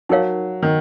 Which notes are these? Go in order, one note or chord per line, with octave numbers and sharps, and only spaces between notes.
F#3 D#4 A#4 C#5 F5
D#3